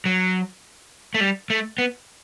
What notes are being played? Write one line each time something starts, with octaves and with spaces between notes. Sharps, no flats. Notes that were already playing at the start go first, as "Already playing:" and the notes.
F#3
A3
G3
A3
B3